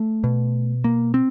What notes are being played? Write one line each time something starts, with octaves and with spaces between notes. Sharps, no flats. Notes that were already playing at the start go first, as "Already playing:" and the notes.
Already playing: A3
B2
A#3
C4